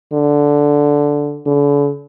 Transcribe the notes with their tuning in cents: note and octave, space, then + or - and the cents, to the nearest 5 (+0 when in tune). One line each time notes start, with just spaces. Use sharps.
D3 -10
D3 -40